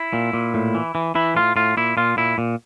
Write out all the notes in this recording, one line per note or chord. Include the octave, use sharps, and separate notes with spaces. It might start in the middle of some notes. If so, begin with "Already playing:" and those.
Already playing: E4
A#2
A#2
A2
E3
E3
E3 E4
A2 F4
A2 F4
A#2 E4
A#2 F4
A#2 E4
A#2